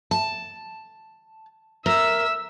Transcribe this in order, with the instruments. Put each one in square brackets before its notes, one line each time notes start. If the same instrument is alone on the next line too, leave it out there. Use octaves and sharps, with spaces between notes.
[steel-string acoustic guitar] A5
[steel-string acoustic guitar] A#4 [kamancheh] E5 E6